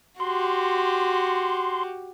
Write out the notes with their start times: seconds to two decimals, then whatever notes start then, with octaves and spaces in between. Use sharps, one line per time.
0.20 F#4 G4 C6